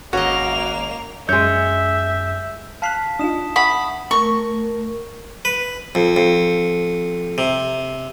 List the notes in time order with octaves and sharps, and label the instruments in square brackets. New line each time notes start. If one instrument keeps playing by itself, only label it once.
[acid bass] G#1 [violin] A#3 F7 [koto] C#4 D#5 [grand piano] F#4
[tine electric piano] F#2 [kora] G#3 C#5 [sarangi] E5 [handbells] G6
[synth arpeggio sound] F5 F6 F#6 [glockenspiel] A5 B6 C7
[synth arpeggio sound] D4 D#4 F4 [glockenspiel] D#6 E7
[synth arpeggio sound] E5 C#6 [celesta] F#5 [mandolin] B5 [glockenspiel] D#6
[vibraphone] A3 A#4 [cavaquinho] C#6
[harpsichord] B4
F2
F2
C3